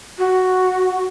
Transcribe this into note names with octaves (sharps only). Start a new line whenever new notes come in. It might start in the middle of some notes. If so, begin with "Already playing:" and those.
F#4